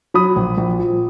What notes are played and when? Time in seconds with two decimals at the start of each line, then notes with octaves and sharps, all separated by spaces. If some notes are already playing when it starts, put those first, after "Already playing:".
0.14 F#3 B5 D#6
0.36 A#1
0.57 A#1
0.79 A#2